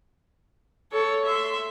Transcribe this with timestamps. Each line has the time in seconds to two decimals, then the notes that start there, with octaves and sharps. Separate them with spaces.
0.92 A4 C#5
1.25 E5 C6